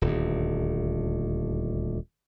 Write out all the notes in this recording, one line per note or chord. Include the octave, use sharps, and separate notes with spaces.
D#1 D2